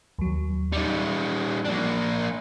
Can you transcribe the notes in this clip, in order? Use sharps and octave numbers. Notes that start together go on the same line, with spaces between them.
D#2 F#3
G3 D#4 C#7
A#3 D4